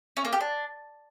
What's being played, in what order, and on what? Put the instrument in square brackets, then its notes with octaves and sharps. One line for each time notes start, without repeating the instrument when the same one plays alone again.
[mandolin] C#4
A#3
G4
D4